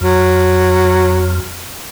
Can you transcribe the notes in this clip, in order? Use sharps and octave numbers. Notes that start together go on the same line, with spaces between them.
F2 F#3